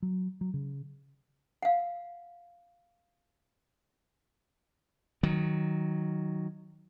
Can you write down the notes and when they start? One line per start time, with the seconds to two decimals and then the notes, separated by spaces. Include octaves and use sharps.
0.02 F#3
0.41 F#3
0.54 C#3
1.63 F5 F#5
5.23 D#3 F#3